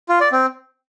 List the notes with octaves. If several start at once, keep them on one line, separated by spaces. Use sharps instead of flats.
F4
D5
C4